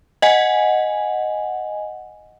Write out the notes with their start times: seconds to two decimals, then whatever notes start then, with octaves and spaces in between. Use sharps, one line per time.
0.22 D#5 F#5 G#5